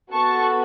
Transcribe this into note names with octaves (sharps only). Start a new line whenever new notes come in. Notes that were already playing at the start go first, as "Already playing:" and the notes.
B3 F#4 A4 A5 C#6